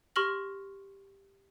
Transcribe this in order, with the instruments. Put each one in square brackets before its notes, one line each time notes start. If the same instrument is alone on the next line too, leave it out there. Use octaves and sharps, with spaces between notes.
[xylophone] G4 C6 C#6 F6 A#6 F#7